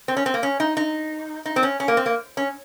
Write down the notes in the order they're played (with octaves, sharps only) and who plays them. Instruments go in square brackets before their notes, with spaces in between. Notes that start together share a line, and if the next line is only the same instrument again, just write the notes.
[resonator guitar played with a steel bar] C4
C#4
C4
A#3
C#4
D#4
D#4
D#4
C4
C#4
C#4
A#3
C4
A#3
C#4